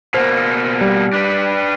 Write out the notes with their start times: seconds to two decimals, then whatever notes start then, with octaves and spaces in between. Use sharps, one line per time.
0.14 B2 A#3 C5
0.81 G3
1.13 D4 B4